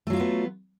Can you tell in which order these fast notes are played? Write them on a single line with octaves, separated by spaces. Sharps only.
A3 F#3 F4 D#4 B3